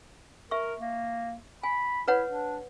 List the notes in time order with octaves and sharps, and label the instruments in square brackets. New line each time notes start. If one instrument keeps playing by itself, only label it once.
[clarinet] A#4 [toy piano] E5 C#6
[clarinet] A#3
[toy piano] G#5 [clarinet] B5
[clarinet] E4 [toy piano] B4 C#5 F#5
[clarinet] D4